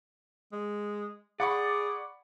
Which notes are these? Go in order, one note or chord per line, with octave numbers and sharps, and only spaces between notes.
G#3
G#4 D5 F#5 B5 C#6